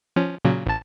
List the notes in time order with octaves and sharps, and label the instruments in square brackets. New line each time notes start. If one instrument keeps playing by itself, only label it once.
[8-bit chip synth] F3 C#4
A#2 C#3 F#3
A1 A5